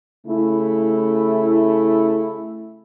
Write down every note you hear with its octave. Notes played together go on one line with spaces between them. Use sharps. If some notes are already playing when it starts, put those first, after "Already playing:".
C#3 A3 E4